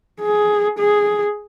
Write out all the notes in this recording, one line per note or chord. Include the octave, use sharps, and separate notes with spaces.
G#4
G#4